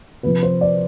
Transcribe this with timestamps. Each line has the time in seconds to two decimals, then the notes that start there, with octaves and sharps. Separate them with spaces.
0.23 C3 F3 B4
0.43 C5
0.61 D5